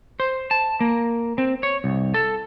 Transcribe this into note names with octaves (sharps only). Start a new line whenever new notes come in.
C5
A5
A#3
C4
C#5
C2
A4